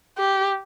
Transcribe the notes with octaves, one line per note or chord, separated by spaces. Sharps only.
G4